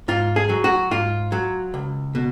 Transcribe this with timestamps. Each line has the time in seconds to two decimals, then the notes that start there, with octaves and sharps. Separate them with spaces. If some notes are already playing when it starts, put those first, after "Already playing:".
0.08 G#2 F4
0.36 G#4
0.49 F#3
0.64 F#4
0.91 G#2 F4
1.32 F#3
1.74 C#2
2.15 B2